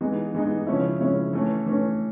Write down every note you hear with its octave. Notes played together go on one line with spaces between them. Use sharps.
E3 G#3 B3 D#4
E3 G#3 B3 D#4
C#3 F3 G#3 C#4 E4
C#3 F3 G#3 C#4 E4
E3 A3 C#4
E3 A3 C#4